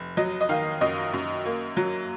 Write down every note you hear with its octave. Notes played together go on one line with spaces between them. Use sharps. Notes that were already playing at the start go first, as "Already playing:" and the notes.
Already playing: F1
F#3 D#5
D#5
D#3 F5
F#2 D#5
F#2
A#3
F#3